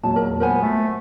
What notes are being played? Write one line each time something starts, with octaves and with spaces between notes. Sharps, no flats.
E2 A#2 F#3 G#3 A5
A#4
B3 A#4 C5 G#5
A3